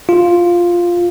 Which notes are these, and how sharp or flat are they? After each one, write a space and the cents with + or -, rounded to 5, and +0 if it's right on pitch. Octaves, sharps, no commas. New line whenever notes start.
F4 +0